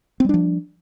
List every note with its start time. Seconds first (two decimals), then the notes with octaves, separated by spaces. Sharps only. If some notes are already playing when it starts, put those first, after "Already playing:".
0.20 C4
0.25 G3
0.29 D4
0.34 F3